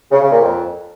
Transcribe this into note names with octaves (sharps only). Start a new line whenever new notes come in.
C#3
C#3
A#2
F2